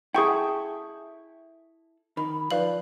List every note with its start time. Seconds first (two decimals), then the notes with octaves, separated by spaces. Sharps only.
0.15 E4 G#4 A4 F#5 G5 C#6 D#6
2.17 D#3 B5
2.51 F3 B4 D5 F5 F#7